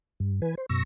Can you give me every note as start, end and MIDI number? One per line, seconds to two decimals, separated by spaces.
0.20 0.40 43
0.42 0.55 52
0.42 0.55 71
0.42 0.55 80
0.57 0.66 72
0.69 0.83 42
0.69 0.83 47
0.69 0.83 85
0.69 0.83 88
0.69 0.83 94